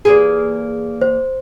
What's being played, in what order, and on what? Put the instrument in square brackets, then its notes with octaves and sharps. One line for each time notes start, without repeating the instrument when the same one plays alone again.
[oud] E2 A#3 G#4
[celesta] C5